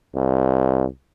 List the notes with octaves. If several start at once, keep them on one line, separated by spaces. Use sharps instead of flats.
C2